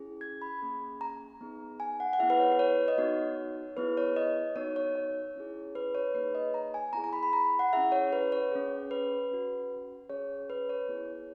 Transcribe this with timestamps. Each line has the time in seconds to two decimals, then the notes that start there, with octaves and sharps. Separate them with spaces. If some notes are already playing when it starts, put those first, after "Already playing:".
Already playing: C#4 E4 G#4
0.21 G#6
0.42 B5
0.62 A#3 C#4 G#4
1.01 A#5
1.41 B3 D#4 G#4
1.80 G#5
2.00 F#5
2.13 F#5
2.19 B3 E4 G#4 E5
2.30 B4
2.40 C#5
2.52 B4
2.59 C#5
2.88 D#5
2.98 B3 D#4 F#4 C#5
3.77 B3 E4 G#4 B4
3.97 C#5
4.16 D#5
4.56 B3 D#4 F#4 C#5
4.76 C#5
4.96 C#5
5.36 C#4 E4 G#4
5.75 B4
5.95 C#5
6.14 A#3 D#4 G#4 B4
6.35 D#5
6.54 A#5
6.74 G#5
6.93 B3 E4 G#4 A#5
7.04 A#5
7.13 B5
7.23 B5
7.33 A#5
7.59 F#5
7.73 C#4 E4 G#4 E5
7.92 C#5
8.13 B4
8.32 C#5
8.52 C#4 G#4
8.91 B4
9.31 C#4 F#4
10.10 C#4 G#4 C#5
10.50 B4
10.69 C#5
10.88 B3 E4 G#4